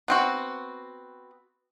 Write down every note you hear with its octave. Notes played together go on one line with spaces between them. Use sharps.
B3 C4 F#4